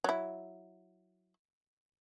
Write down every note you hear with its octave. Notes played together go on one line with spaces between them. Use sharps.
F#3 E4